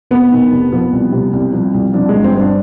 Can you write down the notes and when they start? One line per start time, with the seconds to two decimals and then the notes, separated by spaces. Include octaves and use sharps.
0.11 F1 B3
0.32 D#3
0.51 F1
0.72 F3 B3
0.93 C2
1.12 C3
1.33 C2
1.53 F3
1.74 C2
1.94 F3 D4
2.09 G#3
2.15 G1
2.24 C4
2.35 G2 C4
2.40 D4